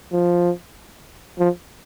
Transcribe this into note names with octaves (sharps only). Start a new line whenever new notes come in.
F3
F3